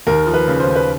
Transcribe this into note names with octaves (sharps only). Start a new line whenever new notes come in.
D#2 A#4
F3
B4
C#3
C5
D#2
B4